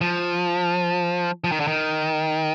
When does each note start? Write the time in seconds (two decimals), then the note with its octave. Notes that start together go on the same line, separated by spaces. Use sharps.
0.01 F3
1.44 F3
1.52 D#3
1.60 D3
1.67 D#3